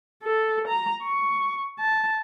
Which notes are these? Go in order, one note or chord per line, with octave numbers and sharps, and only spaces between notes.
A4
A#5
C#6
A5